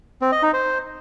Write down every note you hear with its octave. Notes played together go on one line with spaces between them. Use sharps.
C4
D#5
D#4
C5